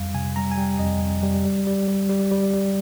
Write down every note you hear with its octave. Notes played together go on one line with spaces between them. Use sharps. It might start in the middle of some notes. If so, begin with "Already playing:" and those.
Already playing: F2 G3 F5
C3 G#5
G3 A#5
G#5
G3 G5
F2 D#5
F2
G3
G3
G3
G3
G3
G3
G3